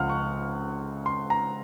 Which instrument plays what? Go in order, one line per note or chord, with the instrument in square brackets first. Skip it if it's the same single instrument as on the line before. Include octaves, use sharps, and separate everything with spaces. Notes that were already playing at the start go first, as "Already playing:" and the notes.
Already playing: [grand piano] C#2 C#3 F3 F5 F#5 F6
C#6
C6
A#5